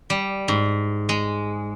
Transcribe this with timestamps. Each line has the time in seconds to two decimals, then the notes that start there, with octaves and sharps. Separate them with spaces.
0.10 G3
0.48 G#2
1.09 G#3